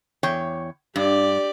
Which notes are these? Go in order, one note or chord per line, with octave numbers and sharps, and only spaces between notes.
E2 C#5 G5
G2 G4 D5